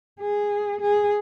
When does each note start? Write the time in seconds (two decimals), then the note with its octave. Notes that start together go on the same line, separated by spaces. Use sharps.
0.20 G#4
0.81 G#4